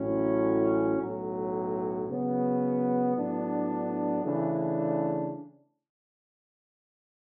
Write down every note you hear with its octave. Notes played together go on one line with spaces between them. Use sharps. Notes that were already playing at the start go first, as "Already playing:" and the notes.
Already playing: A1 A2 F#3 C#4
B1 A2 F#3
C#3 F#3 B3
A2 F#3 B3 D4
C#3 E3 A3 D4